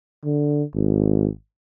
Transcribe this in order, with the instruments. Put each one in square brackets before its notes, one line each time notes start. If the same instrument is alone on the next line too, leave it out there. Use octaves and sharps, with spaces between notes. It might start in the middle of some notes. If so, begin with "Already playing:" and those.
[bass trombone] D3
G#1